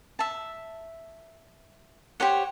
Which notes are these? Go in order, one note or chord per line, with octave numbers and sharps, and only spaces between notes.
E5 A5
G4 C5 C#5 F#5